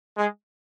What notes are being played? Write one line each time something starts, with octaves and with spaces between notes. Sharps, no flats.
G#3